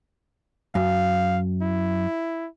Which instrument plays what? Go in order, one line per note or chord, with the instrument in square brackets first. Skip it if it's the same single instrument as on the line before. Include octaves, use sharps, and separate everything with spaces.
[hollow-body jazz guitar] F#2 [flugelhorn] F5
[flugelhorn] E4